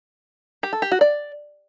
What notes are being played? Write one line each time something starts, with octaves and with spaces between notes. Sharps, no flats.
G4
A4
G4
F#4
D5